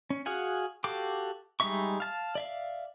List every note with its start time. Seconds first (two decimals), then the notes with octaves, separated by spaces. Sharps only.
0.10 C#4
0.26 F#4 G#4 F5 F#5 G#5
0.84 F#4 G4 A4 F5 D6
1.60 G3 G#3 D#4 E5 C#6
2.00 F5 A5 F6
2.35 D5 E5 F5